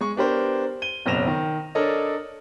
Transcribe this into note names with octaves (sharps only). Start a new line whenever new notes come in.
G#3 C#6
B3 D4 G4 A#4 C5
D#7 G7
F#1 B1 C4 A#6 E7 F7
D#3
D4 A4 A#4 C#5 D#5